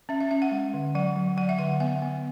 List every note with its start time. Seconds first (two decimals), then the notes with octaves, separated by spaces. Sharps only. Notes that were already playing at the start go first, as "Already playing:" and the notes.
0.09 C#4 E5
0.20 E5
0.31 C#4 E5
0.42 F#5
0.51 G#3
0.74 D3
0.95 F#3 F#5
1.16 F#3
1.37 F#3 F#5
1.49 E5
1.59 D3 F#5
1.80 B3 E5
2.02 B3